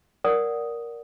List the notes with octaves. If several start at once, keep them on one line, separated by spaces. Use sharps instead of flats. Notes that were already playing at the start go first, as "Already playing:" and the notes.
A#4 D5 F#5 D#6